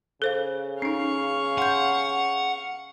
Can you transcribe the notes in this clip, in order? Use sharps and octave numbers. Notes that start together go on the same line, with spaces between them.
C#3 A4 C5 F5
C#4 D#4 F5 C#6
F#5 C6 G6